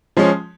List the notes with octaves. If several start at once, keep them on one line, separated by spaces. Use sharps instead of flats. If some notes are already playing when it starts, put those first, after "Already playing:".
F3 G#3 C#4